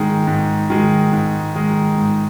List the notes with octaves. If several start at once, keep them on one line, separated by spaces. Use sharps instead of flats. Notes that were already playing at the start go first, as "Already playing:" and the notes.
Already playing: G#2 D#3 G#3
G#2
D#3 G#3
G#2
D#3 G#3
G#2